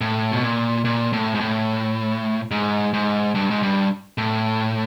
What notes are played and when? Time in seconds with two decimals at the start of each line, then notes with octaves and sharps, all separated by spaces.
0.01 A2
0.32 B2
0.43 A#2
0.85 A#2
1.13 A2
1.34 G#2
1.40 A2
2.51 G#2
2.93 G#2
3.35 G2
3.50 G#2
3.62 G2
4.18 A2